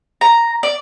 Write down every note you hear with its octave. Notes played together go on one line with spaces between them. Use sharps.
A#5
D5